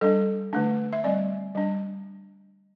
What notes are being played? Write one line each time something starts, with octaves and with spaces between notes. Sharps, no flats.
G3 D4 A4
D3 A3 D4
E5
G3 C4 D5
G3 D4